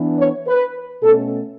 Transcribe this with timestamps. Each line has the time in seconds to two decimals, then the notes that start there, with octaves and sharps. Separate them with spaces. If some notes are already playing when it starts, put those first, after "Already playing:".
Already playing: E3 B3 D4
0.19 C#5
0.47 B4
1.03 B2 A3 C#4 A4